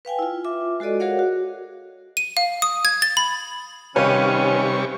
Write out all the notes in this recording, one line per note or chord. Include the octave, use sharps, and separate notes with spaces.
B4 F5 G5 G#5
E4 F4
F4 E5 D6
G#3 F#4 A4 D5 D#5
F#4 G#4 A#4 C#5 F5 F#5
F#4
D#7
F5
D#6
G#6
A6
B5
C3 D#3 G3 C#4 B4 C#5 F5 C#6